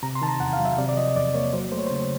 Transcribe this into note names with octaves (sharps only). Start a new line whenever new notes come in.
C3 A#5
C6
D#3 A5
A#5
E2 F#5
F5
F#3
E5
C3 D5
D5
F3 D#5
E2 D5
A#3 C#5
F#3 C5
A3 C5
C#5
C#3 C5